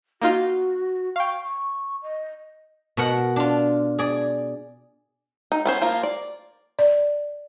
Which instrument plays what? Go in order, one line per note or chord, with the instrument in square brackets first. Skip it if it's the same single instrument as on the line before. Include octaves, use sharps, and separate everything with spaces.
[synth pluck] A#3 D#4 F4 [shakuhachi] F#4
[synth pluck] F5 G5 [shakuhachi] C#6
[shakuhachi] C#6
D#5
[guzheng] B2 A#4 F#5
D4 F4
G#4 D5
[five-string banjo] D#4
B3 C#4 C5
F3 A#3 F4
D5
[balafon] D5